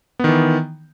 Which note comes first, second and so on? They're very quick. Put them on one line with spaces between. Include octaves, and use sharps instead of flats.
B3 D#3 E3